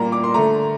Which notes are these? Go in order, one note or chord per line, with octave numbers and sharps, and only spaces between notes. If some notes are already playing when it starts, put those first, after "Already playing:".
Already playing: A#2 G3 A#3 A#5
D6
C6
D3 A3 A#5